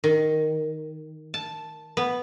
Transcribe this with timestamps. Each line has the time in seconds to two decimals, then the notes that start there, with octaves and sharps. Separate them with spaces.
0.04 D#3
1.34 A5
1.97 B3